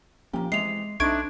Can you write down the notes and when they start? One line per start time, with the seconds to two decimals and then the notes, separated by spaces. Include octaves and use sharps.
0.33 A#2 F3 A#3 C#4 G4
0.52 E3 G#3 C4 D#5 C7 F7
1.00 B1 A3 C4 D4 D#4 C#6 G#6 D7